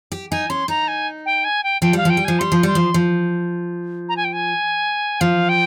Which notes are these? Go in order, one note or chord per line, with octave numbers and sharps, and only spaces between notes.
G4
D#4 G#5
C#4 C6
D#4 A#5
G#5
G5
G#5
G5
F3 G5
G3 F5
F3 G5
G3
F3 G#5
G3 C6
F3
G3 C6
F3
F3
A#5
G#5
G5
G#5
F3 F5
G5